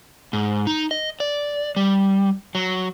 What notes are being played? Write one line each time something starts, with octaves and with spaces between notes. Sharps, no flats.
G#2
D#4
D#5
D5
G3
F#3